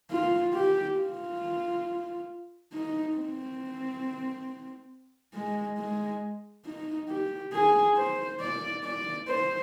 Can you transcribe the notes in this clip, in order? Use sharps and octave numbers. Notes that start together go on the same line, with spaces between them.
F4
G4
F4
D#4
C4
G#3
G#3
D#4
G4
G#4
C5
D5
D5
C5